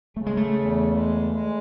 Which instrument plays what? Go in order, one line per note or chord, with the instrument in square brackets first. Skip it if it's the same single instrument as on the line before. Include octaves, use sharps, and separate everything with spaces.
[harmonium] C#3 [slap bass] A3
[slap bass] G#3
A3
[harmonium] E2
G#3
G#3